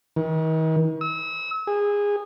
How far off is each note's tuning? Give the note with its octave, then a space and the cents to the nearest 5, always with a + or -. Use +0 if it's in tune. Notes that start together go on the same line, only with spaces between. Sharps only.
D#3 +40
E6 -35
G#4 -20